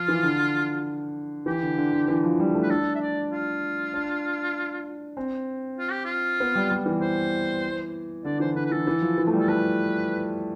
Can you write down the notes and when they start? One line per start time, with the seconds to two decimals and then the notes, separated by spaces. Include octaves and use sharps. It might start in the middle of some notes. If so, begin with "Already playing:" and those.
Already playing: F3 F4
0.08 E3
0.23 D3
1.46 E3 G4
1.62 D3
1.77 D3
1.93 D3
2.08 E3
2.24 F3
2.40 G3
2.54 A3
2.63 B4
2.69 D4 A4
2.95 E5
3.01 D5
3.31 F4
3.94 D4
5.17 C4
5.79 F4
5.91 G4
6.05 F4
6.40 B3
6.55 G3
6.71 G3
6.86 E3
7.01 C5
8.25 D3 D5
8.40 E3 C5
8.56 D3 B4
8.66 B4
8.72 E3 A4
8.87 E3
9.02 F3
9.18 E3
9.27 A3
9.33 G3
9.40 A4
9.48 A3 B4